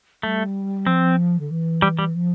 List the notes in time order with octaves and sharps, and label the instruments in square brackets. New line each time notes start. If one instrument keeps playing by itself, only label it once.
[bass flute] G3 [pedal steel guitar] A3
[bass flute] F3 [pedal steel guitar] C4
[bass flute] D3
E3
[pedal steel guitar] G3
G3
[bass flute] F3